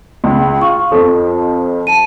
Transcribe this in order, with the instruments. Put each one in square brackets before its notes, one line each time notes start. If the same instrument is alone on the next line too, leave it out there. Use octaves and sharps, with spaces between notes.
[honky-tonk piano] C#2
[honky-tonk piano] F4 [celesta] C#6
[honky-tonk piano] F2 F3 [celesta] A4
[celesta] A5 D#7